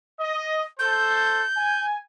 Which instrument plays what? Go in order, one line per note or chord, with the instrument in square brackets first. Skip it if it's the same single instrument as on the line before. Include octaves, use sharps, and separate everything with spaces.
[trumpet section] D#5
[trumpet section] A4 C5 [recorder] G6
[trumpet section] G#5